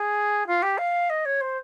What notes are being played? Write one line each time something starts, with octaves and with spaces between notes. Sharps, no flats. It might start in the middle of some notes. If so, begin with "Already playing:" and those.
Already playing: G#4
F4
G4
F5
D#5
C#5
C5